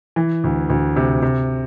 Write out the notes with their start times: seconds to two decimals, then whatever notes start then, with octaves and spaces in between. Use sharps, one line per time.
0.16 E3
0.44 D2
0.70 D2
0.96 C3
1.22 C3